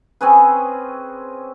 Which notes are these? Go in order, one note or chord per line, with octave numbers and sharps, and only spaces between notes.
C4 C#4 G#4 B4